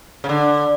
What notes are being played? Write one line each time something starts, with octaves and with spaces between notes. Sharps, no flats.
C#3
D3